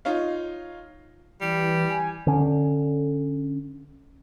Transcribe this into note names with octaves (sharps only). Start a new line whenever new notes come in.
D#4 F4 C#5 F5
E3 G3
G#5
D3 C#4